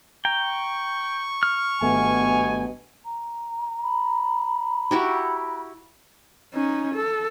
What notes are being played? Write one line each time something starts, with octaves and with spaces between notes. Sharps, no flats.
G5 A#5 C#6
F6
G#1 G2 B2 A3 B3 G#5
A#5
B5
E4 F#4 G4
C#4 D#4
A4